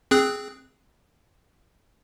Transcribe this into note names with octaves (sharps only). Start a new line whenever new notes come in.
C4 G#4 F#6